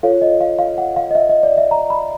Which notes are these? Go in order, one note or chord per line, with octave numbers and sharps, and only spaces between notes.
F4 A4 C#5 F5
D#5
F5
F5
F#5
F5
D#5
E5
D#5
D5
E5
A#5
B5